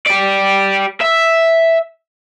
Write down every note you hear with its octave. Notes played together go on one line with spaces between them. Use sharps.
G4 D5
E5